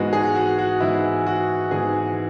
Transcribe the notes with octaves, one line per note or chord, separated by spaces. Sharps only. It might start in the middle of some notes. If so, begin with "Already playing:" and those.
Already playing: G#2 E3 G#3 B3 F#4
G#4
F#4
F#4
G#2 E3 G#3 B3 E4
F#4
G#2 E3 G#3 B3 G#4